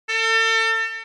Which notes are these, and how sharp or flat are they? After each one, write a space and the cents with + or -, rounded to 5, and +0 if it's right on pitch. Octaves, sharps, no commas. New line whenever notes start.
A4 +35